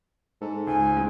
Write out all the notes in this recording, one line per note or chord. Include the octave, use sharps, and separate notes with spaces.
G#2 A4
C#2 G#5
A1 G#3